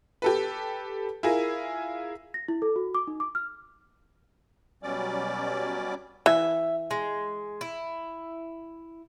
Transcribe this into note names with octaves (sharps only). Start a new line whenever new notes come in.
G4 A4 B4
E4 F4 G#4 A#4
A#6
E4
A4
F#4
D6
D#4
D6
F6
B2 F#3 G3 C#4 D5 D6
E3 E5
G#3
E4